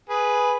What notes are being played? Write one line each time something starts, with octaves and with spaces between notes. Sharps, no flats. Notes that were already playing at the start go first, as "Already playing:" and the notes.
G#4 B4